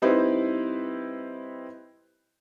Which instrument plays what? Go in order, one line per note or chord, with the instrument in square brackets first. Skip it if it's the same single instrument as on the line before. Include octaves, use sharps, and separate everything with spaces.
[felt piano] G3 C4 D#4 E4 B4 C5